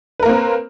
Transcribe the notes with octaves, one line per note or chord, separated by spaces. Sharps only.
A#3 C4 A#4 B4